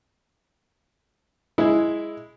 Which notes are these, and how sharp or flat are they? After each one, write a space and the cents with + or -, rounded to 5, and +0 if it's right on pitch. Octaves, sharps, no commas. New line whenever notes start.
G#3 +0 E4 +0